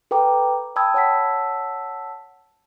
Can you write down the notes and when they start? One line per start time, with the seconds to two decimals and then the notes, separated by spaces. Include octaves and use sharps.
0.11 A4 B4 G5 A#5 D6
0.76 G5 A5 B5 D#6 E6 G#6
0.94 C#5 F#5 A5 E6 B6